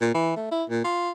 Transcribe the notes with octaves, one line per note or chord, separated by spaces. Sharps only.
A#2
E3
A3
E4
A#2
F4